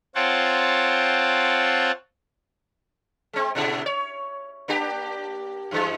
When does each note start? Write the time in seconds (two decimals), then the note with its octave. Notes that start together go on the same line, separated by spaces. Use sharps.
0.15 C4 F4 C#5 F#5 G5 A5
3.33 G#3 C4
3.55 A#2 C#3 E4
3.86 C#5
4.68 A#3 D4 G4
5.71 F#2 E3 G#3